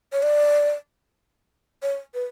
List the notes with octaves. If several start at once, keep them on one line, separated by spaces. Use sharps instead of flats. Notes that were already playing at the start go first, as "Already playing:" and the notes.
C#5
D5
C#5
B4